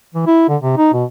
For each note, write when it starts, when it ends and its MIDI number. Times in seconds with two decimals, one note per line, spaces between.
0.15 0.26 52
0.27 0.47 64
0.49 0.57 50
0.62 0.76 48
0.77 0.90 63
0.93 1.05 47